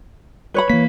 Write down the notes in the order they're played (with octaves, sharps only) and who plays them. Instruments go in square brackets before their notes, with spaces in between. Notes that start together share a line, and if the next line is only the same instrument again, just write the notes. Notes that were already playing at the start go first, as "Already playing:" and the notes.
[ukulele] B4 C#5 B5
[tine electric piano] E3 B6 [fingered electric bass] A#3